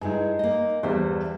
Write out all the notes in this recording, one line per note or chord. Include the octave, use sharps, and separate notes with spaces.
G2 G#3 D#4 E4 G#5
A#3 D#5
E2 G2 G3 C5 E5